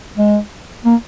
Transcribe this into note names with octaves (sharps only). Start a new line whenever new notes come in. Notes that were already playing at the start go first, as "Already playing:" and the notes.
G#3
A#3